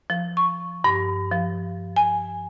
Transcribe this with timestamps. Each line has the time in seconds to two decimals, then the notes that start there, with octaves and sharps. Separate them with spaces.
0.10 F3
0.37 C#6
0.84 G2
1.32 F3
1.96 G#5